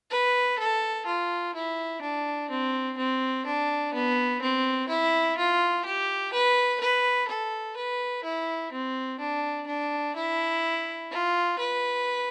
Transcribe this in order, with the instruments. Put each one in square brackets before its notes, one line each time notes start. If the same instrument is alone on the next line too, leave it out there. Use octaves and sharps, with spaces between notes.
[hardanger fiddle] B4
A4
F4
E4
D4
C4
C4
D4
B3
C4
E4
F4
G4
B4
B4
A4
B4
E4
C4
D4
D4
E4
F4
B4